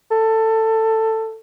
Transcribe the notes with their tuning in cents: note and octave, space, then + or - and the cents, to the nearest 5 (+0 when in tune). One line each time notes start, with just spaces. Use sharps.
A4 +15